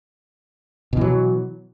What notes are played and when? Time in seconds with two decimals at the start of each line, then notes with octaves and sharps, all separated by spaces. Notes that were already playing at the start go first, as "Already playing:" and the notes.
0.93 B2
0.97 E3
1.01 F#3